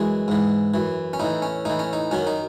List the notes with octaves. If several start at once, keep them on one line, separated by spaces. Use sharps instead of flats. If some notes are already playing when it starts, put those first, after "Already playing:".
Already playing: F#2 E3 G#3 G#4
G#2 E3
F#2 E3
C#4
A2 E3 D#4
C#4
A2 E3 D#4
C#4
D#4
F#2 D#3 F#3 C#4
D#4